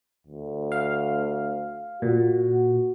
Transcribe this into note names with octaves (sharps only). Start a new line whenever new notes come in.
D2
F5
A#2 F#4